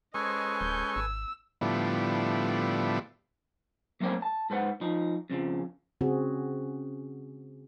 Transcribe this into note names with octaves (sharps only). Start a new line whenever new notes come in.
G#3 C#4 A4 B4 C5 D#5 G#5 C#6
D1 G6
G#1 E6
A2 D3 F3 G3 B3 E4
F#3 A3 A#3 C4 C5 C#5
A5
G#2 B4 C5 F#5
F3 D#4
F2 C#3 F3
C#3 C4 F#4 G#4